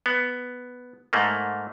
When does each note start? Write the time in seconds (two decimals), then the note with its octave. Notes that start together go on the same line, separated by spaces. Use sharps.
0.06 B3
1.13 G#2 A3 A#3